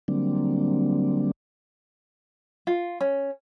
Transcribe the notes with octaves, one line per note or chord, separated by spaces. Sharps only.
D3 F#3 G3 A#3 C4 D4
F4
C#4